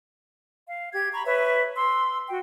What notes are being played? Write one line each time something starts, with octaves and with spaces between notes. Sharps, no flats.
F5
G4 G#6
A#5 B5 C#6
B4 C#5 E5 C#6
C6 E6
F#4 G5